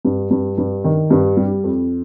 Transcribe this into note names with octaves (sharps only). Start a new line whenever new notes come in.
G2
G2
G2
D#3
G2
G3
F2